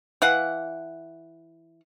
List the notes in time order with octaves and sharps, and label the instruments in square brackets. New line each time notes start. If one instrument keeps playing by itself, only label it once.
[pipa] E3 F5 F#5